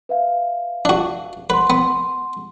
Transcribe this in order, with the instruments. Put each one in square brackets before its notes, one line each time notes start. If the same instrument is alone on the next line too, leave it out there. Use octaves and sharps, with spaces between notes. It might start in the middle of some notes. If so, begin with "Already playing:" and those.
[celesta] B4 E5 F5
[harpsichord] D4 F#4
[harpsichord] B4 [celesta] F#5 C6
[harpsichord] B3